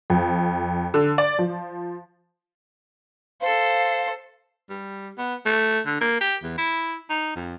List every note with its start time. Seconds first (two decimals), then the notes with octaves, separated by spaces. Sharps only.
0.10 F2
0.94 D3
1.18 D5
1.39 F3
3.41 A4 C5 F5
4.69 G3
5.18 B3
5.46 A3
5.86 D3
6.01 A#3
6.21 G4
6.43 E2
6.58 E4
7.10 D#4
7.36 F2